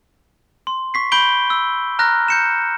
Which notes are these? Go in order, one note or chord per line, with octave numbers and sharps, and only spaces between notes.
C6
C#6 B6 C7
B5 G6 D7 G7
E6
A#5 F6 F#6 A#6
G6 C#7 E7